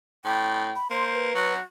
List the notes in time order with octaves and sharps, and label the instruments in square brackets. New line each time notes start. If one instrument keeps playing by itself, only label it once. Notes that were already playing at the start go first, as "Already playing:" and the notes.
[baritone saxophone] A2 [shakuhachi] G5
[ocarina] B5
[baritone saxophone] A#3 [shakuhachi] C5 [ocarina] C6
[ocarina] B4
[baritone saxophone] F#3 [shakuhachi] F#4